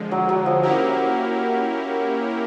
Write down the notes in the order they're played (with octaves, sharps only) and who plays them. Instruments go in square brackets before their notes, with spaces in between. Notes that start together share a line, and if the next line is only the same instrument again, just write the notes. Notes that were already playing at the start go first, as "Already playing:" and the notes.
Already playing: [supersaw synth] D3 F3 G#3
[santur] F#3
F#3
F3
[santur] F#3 [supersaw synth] A#3 C#4 E4 G4 A#4